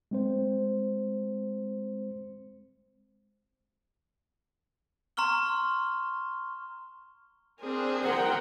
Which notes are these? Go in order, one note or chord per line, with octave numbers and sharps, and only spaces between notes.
G#3 C4 C5
A#5 C6 C#6 F6 G7
C4 D4 G#4 A#4 C5
A#4 F#5 G5 A#5